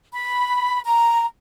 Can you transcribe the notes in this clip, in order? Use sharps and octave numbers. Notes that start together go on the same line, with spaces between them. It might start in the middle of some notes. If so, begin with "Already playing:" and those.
B5
A#5